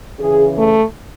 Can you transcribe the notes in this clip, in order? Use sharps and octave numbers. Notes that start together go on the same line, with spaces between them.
C#3 E3 G#4
A3